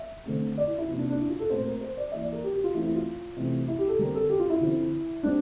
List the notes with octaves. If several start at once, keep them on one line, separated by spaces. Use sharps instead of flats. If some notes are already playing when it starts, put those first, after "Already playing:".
Already playing: E5
D3 A3 C4
D5
E4
E4
C3 F3 A#3
D4
D4
E4
F4
A4
A#2 A3 C4 C5
A#4
C5
D5
E3 A#3 E5
D5
A#4
G4
G4
F4
E3 A3 C4 E4
E4
F4
C3 E3 A3 C4
E4
G4
A4
D3 G3 C4 A#4
A4
G4
F4
E4
D3 F3 C4
G3 C4 D4